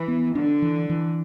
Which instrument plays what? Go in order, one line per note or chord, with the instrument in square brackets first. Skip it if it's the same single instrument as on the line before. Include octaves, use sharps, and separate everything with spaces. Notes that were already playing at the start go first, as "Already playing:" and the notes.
Already playing: [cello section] E3
[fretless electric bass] B3
[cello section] D3 [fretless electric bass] D4
[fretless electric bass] E3
E3